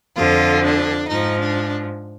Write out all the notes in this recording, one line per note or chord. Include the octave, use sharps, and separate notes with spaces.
F2 D3 F3 F4
D4
G#2 F3 D#4
D4